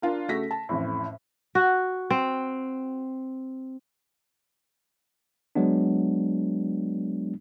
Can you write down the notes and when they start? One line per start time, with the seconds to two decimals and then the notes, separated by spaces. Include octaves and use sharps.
0.02 D4 F4 A#4
0.28 C#3 A3 F#4 A#6 B6
0.51 A5
0.69 A1 F2 A2
1.55 F#4
2.10 C4
5.55 F#3 G#3 B3 D4